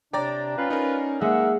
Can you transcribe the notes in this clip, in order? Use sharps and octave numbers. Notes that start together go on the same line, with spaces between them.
C3 D4 D5 G5 A#5 A6
C#4 F4 B4
C#4 D#4 A#4
G#3 A#3 E5 F#5